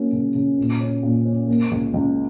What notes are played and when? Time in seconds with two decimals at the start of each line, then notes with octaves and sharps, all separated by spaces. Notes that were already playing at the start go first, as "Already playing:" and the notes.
Already playing: F#3 A#3 C#4
0.12 C#3
0.35 C#3
0.58 A#2
0.81 C#4
1.03 A#2
1.25 C#4
1.48 A#3
1.71 C#2
1.94 C#2